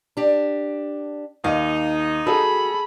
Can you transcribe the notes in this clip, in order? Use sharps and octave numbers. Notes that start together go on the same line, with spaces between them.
D4 G4
D#2 D#4 D#5 F5
F#4 G#4 A4 B5